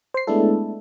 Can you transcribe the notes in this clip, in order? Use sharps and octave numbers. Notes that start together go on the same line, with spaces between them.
C5 C7
G#3 A3 B3 D4 E4 A4